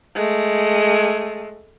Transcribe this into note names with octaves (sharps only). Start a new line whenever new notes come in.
G#3 A3